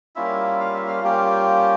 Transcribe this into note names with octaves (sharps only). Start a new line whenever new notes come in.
G3 A#3 C#4 E4 F4 E5
F5
E5
F4 F5
G3 A#3 C#4 F4 G4 G5